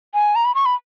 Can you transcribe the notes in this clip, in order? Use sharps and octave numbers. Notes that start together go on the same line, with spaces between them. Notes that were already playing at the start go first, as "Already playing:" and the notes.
G#5
A#5
B5
C#6
B5